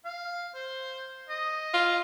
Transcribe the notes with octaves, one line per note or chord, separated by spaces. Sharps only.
F5
C5
D#5
F4